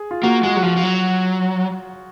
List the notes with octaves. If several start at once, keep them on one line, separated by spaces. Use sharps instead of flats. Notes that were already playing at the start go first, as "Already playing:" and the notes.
Already playing: G#4
F4
A#3 F#4
G#3 F#4
F#3
F3 F#4
F3
F#3